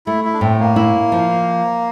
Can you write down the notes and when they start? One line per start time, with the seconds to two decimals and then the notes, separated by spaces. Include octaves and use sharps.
0.06 A3 E4
0.25 E4
0.34 D4
0.41 A2 C4
0.60 A#3
0.76 E4
1.12 F3